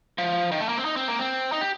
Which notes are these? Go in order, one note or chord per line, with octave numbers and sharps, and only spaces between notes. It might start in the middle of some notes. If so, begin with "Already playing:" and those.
F3
D#3
A3
A#3
C4
D#4
C4
A#3
C4
D#4
G4